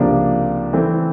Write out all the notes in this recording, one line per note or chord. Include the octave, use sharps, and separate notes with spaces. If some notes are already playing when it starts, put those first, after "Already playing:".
Already playing: C#2 C3 F3 A#3 D4
E3 A3 C4